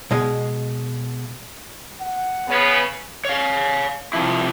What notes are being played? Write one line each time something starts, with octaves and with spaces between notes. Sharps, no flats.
B2 G#3 D#5
F#5
C#3 B3 C#5
C#5 F5
C3 F3 E4